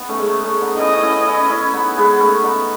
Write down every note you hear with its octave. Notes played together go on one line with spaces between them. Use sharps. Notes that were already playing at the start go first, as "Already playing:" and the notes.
Already playing: B3 D#4
A3 C#4
G#3
A3
A3 C#4
B3 D#4
C#4 D#4 E4 D#5
C#4 E4
C#4 E4
C#4 E4
B3 D#4
G#3 B3
A3 C#4
B3 D#4